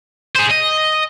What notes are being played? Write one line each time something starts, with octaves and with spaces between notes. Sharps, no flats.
G#4 C5
D#5